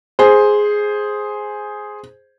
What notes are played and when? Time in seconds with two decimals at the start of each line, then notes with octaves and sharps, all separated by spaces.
0.19 G#4 C5